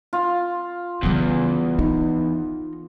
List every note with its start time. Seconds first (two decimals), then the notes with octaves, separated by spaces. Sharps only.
0.13 F4
1.03 E2 C#3 G3
1.79 D#4